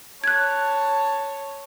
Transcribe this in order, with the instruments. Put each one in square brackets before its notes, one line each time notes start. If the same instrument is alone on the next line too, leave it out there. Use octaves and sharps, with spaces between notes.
[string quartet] C#5 A5 [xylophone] F#6 G#6